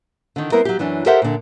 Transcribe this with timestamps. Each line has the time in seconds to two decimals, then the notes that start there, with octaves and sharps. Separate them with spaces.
0.36 D3 D#3
0.52 G3 B3 C4 E4 A#4
0.65 F#3 G4
0.79 F#2 E3 F#3 D4
1.06 G4 A4 A#4 C5 E5 F#5
1.22 A#2 D3